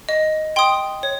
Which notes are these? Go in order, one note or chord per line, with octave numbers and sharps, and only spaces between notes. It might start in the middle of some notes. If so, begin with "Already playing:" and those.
D#5
G5 C6 D#6
C#5